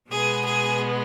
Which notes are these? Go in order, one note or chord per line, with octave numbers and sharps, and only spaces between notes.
B2 G#3 B3 G#4
G#4